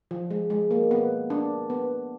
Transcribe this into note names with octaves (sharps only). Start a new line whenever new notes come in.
F3
G#3
G#3
A#3
B3
D4
B3